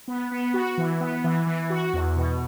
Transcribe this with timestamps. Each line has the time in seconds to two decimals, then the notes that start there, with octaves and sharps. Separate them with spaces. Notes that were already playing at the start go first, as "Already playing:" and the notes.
0.08 B3
0.31 B3
0.54 F#4
0.78 E3
1.00 B3
1.24 E3
1.46 E3
1.70 F#4
1.93 E2
2.16 B2